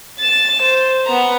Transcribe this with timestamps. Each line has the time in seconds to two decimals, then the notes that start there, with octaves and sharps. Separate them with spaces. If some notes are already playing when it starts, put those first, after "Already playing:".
0.20 A6 E7
0.62 C5
1.06 B3 A#5